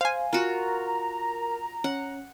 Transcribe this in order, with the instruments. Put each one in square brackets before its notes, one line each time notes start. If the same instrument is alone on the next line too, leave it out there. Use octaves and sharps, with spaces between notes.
[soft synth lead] C5 [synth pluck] F5 G#5
[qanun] F4 F#4 [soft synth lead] A#4 [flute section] A#5
[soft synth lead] C#4 [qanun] F#5